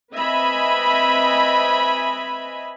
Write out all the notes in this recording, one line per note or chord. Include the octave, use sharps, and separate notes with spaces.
C4 B4 D#5 E5 G#5 B5